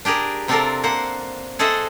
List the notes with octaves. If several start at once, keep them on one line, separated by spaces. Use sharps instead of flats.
D4 G4 G#4 A#4
C3 C4 D4 F4 A4 A#4
A#3 C5 F#5
G#4 A4 C5 D#5 E5 F#5